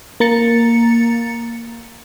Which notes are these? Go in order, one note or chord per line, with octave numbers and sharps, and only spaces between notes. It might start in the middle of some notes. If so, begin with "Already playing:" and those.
A#3 A#5 A6 C#7